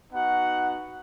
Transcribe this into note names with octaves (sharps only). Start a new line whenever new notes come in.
B3 D#4 F#4 F#5